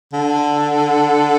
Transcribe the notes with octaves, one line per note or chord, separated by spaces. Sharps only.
D3